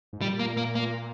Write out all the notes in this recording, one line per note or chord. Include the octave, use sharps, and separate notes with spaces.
G#2
A#2 G3
A#3
A#3
A#3